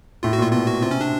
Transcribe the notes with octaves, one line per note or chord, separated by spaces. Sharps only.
A2 F4
F#4
A#2 F4
B2 F4
F#4
C3 F4
C#4
D4